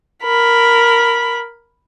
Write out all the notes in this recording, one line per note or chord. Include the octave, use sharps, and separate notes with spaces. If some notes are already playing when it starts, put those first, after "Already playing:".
A#4 B5